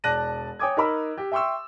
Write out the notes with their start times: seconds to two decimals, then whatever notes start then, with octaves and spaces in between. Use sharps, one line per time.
0.04 E1 D5 A5 F#6 A#6 D#7
0.59 C#5 G5 G#5 D6 D#6 G#6
0.77 D#4 A#4 B5 E6
1.17 G4
1.32 E5 G5 C6 C#6 E6